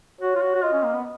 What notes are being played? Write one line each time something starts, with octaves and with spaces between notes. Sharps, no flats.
F#4 C#5
F4
F#4
F#4
F4 D#5
C#4
A#3
B3